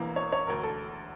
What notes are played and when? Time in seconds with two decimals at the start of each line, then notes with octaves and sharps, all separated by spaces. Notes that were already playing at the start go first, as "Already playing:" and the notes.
Already playing: E1 E2 E3 A#3
0.16 C#5
0.32 C#5
0.47 E1 D2 D3 A#4
0.63 A4